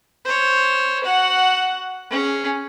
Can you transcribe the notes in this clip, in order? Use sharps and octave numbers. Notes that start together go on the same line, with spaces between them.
C5 C#5
F#4 F#5
C#4 G#4